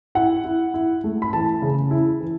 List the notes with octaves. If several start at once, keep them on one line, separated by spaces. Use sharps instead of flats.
E4 F#5
E4
E4
A3
B5
E3 A5
C#3
E4
E3